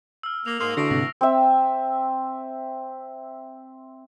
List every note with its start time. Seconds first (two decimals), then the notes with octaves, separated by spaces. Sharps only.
0.23 E6 F6
0.46 A#3 F7
0.61 G#2 A#3 C6 D#6
0.77 D3 E3 A3 F#4 A#6 C7 D7
0.91 G#2 C3 A#6
1.21 C4 E5